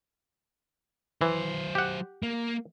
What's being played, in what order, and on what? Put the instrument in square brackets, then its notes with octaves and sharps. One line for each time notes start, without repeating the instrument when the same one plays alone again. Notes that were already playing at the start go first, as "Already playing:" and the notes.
[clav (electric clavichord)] E3 [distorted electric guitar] F#3 C5
[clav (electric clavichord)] G4 F#5
[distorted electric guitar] A#3